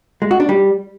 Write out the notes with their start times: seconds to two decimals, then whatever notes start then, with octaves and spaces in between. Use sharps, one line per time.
0.22 G#3
0.31 F#4
0.40 D4
0.49 G3